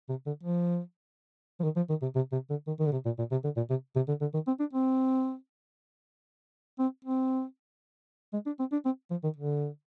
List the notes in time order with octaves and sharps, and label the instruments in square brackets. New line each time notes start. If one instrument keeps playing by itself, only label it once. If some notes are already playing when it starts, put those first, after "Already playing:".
[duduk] C3
D3
F3
F3
D#3
F3
D#3
C3
C3
C3
D3
D#3
D#3
D3
C3
A#2
A#2
C3
D3
A#2
C3
C3
D3
D3
D#3
C4
D4
C4
C4
C4
G#3
D4
C4
D4
C4
F3
D#3
D3